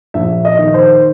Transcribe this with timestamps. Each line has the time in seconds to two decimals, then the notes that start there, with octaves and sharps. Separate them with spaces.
0.14 A#1 E5
0.45 D#5
0.59 D#3
0.74 C5